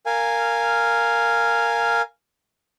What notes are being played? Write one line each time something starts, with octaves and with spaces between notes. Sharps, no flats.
A#4 F5 G#5